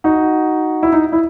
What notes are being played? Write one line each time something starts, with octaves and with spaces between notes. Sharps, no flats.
D#4 F#4
E4
D#4
E4